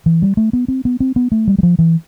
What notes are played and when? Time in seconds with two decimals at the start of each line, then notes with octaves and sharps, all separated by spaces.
0.06 E3
0.22 G3
0.37 A3
0.53 B3
0.68 C4
0.85 B3
1.00 C4
1.16 B3
1.32 A3
1.48 G3
1.58 G3
1.63 F3
1.79 E3